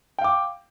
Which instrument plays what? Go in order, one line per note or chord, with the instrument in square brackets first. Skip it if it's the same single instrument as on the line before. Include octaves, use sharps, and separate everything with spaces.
[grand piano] G5
F5
D6